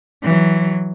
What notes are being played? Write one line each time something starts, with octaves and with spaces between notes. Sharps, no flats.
E3 F#3